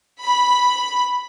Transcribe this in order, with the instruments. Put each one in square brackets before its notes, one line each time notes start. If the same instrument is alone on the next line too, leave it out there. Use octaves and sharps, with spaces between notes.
[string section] B5